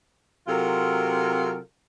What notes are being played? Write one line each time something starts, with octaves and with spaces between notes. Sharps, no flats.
C3 F#3 F4 A4 A#4